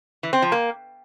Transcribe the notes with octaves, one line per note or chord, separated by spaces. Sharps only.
E3
C4
F3
A#3